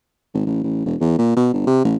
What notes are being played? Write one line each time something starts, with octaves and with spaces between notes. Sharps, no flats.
G#1
A1
A1
E1
E2
A#2
B2
G1
C3
A1